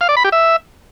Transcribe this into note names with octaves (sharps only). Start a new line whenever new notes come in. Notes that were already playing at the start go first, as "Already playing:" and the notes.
F5
D5
B5
G4
E5